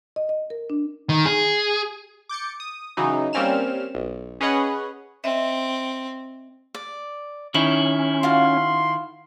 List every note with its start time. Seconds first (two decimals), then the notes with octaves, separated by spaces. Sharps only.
0.16 D#5
0.29 D#5
0.50 A#4
0.70 D4
1.09 D#3
1.25 G#4
2.29 D6 G6 A6 C#7
2.60 D#6
2.97 C#3 E3 F#3 D#4
3.33 G3 A#3 C4 C#4 F6 E7
3.95 B1
4.40 C#4 G#4 B4 C#5 D#5 F#5
5.24 C4 D#5 E5
6.74 D5
7.54 D#3 C#4 D#4 E4 C#5
8.23 F4 F#4 F5 C6